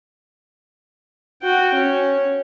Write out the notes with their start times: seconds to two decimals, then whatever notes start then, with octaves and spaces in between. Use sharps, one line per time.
1.42 F#4 G5
1.75 C#4